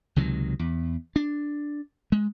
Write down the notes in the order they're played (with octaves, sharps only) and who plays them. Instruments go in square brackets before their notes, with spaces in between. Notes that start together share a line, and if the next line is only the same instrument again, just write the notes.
[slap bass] C#2 C3 D#3 F#3
E2
D4
G#3